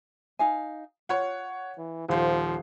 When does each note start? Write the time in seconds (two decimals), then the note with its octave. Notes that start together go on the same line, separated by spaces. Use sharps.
0.39 D#4 F5 G#5
1.09 F4 C#5 F#5
1.78 E3
2.09 D#1 F3 C5